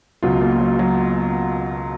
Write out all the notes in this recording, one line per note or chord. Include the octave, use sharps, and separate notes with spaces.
C#2 B2 F#3 F4
A#3
F#3
F#3